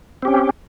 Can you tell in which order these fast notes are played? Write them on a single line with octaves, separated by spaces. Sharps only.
C4 G4 C#4